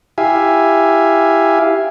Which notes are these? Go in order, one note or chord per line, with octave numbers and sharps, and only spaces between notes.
E4 G4 E5 F5 G#5